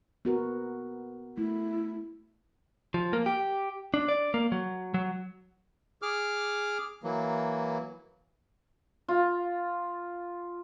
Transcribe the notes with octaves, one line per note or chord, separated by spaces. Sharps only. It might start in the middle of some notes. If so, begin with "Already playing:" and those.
B3 F#4 A#4
A3 E4
F3
A#3
G4
D4
D5
A#3
F#3
F#3
G#4 D6 F6
E3 F#3 A#3
F4